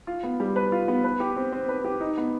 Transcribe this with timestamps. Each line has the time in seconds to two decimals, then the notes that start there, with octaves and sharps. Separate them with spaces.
0.07 F4
0.23 B3
0.40 G3
0.56 B4
0.72 F4
0.88 B3
1.04 B4
1.20 G4
1.37 C4
1.52 C4
1.68 B4
1.85 G4
2.01 D#4
2.17 B3